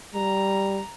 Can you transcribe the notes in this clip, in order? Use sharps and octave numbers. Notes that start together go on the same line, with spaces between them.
G3 A#5